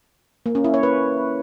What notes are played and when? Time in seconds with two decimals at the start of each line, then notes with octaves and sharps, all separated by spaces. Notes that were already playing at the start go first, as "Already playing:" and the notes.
0.46 A#3
0.55 C#4
0.64 E4
0.74 C#5
0.83 B4